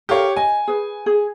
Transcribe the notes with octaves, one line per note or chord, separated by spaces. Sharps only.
G4 A4 A#4 C#5 F5
D#5 G#5
G#4 B4
G#4